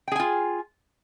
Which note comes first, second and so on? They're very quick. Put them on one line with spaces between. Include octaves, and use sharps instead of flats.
G5 G#4 G#5 F4